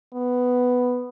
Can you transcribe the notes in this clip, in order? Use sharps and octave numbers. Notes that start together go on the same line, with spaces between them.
B3